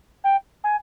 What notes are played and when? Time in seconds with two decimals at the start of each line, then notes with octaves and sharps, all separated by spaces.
0.23 G5
0.63 G#5